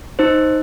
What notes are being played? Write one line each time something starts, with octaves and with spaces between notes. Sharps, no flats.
D#4 C5